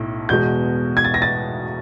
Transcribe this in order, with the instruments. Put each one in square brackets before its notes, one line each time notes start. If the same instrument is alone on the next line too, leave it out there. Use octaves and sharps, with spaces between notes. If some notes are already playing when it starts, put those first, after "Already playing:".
Already playing: [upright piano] B1 A2
E2 B2 G#3 G6
G#6
A6
A#6
A6